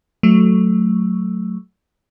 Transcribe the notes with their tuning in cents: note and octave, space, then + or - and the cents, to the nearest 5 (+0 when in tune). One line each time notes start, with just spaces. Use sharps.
F#3 +0 A3 -5